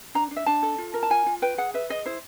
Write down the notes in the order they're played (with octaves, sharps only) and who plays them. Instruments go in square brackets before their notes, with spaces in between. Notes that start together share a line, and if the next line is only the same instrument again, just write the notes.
[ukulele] D4 A#5
D4
E5
D4 A5
A4
F4
A#4
A5
F4 G#5
F4
B4 G5
G#4 F#5
B4 E5
G#4 D#5
E4 C5